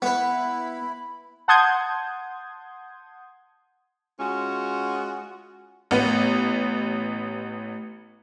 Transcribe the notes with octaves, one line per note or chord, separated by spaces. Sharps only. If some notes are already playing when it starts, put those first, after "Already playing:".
B3 E4 B4 B5
F#5 A5 C6 D#6 G6 G#6
G#3 C#4 F4 F#4
A1 B3 B4